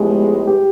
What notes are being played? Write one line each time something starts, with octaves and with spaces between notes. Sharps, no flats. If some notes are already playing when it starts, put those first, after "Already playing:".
Already playing: A2 F3 G#3 B3 G4
G4